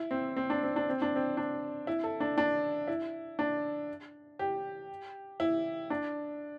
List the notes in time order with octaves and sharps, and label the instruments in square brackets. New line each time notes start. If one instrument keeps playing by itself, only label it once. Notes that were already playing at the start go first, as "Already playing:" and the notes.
Already playing: [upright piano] E4
C4
C4
D4
C4
D4
C4
D4
C4
D4
E4
A4
D4
D4
E4
D4
G4
E4
D4